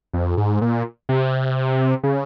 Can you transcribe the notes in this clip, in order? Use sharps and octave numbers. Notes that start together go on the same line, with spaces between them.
F2
G#2
A#2
C3
C#3